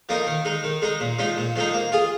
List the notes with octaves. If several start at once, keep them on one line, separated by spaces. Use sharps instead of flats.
F3 A#3 D#4 A#4
D#3
G#3 D#4
D#3
G#3 D#4
A#2
F3 G#3 D#4
A#2
F3 G#3 D#4
A#3
F4 G#4